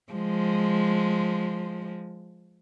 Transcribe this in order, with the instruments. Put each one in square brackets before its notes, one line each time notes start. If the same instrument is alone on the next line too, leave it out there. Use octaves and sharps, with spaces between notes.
[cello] F3 G#3